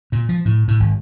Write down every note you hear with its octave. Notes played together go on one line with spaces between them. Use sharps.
A#2
F3
A2
A2
G#1